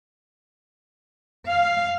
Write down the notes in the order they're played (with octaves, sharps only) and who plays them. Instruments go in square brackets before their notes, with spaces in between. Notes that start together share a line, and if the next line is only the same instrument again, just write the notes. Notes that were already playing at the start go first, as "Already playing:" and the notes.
[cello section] F5